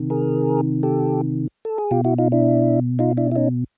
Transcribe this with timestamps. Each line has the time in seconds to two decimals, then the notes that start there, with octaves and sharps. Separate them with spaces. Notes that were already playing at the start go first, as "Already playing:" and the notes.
Already playing: C3 D#3
0.10 G#4 A#4
0.83 G4 A4
1.65 A4
1.78 G#4
1.91 B2 F4 G4
2.05 E4 F#4
2.18 D#4 F4
2.32 D4 E4
2.99 D#4 F4
3.17 D4 E4
3.31 E4
3.35 C#4 D#4